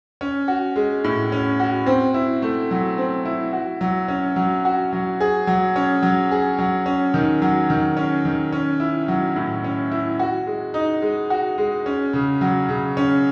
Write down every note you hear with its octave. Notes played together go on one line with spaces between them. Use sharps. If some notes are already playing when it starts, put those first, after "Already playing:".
C#4
F#4
G#3
A2
C#4
F#4
C4
E4
A3
F#3
C4
E4
F#4
F#3
C#4
F#3
F#4
F#3
G#4
F#3
C#4
F#3
G#4
F#3
C#4
D#3
F#3
D#3
C#4
D#3
C#4
E4
F#3
A2
C#4
E4
F#4
G#3
D#4
G#3
F#4
G#3
C#4
C#3
F#3
C#3
C#4